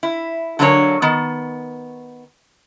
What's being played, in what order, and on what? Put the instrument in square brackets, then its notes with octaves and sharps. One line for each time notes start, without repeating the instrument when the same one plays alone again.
[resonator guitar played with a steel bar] E4
D3 F#3 A#3 D4 F#4 C#5
D#3 B3